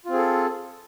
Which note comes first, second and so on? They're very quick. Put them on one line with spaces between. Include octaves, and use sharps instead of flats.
F4 C4 G#4 A4